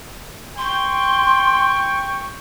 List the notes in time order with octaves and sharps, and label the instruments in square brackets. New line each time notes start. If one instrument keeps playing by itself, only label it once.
[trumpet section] G5 C#6 [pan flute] C6